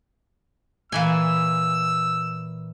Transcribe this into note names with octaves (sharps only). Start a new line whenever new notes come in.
A#2 E3 G#5 E6